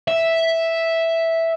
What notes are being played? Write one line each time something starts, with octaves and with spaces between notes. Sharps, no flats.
E5